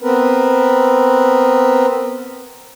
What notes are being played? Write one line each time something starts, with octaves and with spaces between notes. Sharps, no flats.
B3 C4 A#4 B4